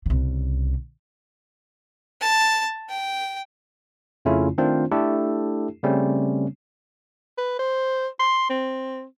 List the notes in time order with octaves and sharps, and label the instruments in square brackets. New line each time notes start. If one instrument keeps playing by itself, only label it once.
[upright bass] C2 C#3
[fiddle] A5
G5
[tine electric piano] F2 C#3 A3 C#4 E4 F4
D#3 A3 C4 D4 F4 C5
A3 D4 E4 G4 A4
C#3 G3 A3 C4 C#4
[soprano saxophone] B4
C5
C6
C4